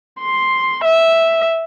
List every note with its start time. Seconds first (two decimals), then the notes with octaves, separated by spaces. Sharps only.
0.21 C6
0.85 E5